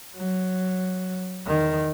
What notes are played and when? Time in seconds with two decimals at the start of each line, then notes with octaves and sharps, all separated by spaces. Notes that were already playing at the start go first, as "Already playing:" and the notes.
0.16 F#3
1.46 E2 D#3